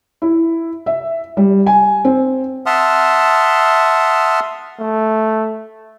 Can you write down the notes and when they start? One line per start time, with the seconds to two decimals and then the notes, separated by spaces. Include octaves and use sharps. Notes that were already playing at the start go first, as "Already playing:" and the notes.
0.22 E4
0.86 E5
1.37 G3
1.66 G#5
2.05 C4
2.66 E5 F#5 A5 C6 D#6 F6
4.80 A3